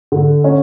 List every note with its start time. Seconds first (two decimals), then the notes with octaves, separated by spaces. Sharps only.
0.12 D3
0.44 C#4